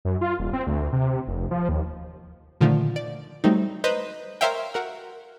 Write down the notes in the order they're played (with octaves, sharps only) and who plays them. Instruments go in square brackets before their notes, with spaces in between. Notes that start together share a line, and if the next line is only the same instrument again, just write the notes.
[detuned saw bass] F#2
F4
D#1
C4
D2
C3
F1
F3
D#2
[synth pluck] A#2 D3 D#3 F3 A3
D5
F#3 G3 A3 C4 D#4
B4 C5 D#5 A#5 D#6 F#6
A#4 C5 C#5 E5 F5 G5
F#4 A#4 F#5